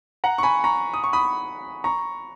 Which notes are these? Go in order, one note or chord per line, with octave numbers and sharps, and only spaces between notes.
F#5 A#5
C#6
G#5 B5
A#5 C#6
D#6
C#6
B5 D#6
A#5 C#6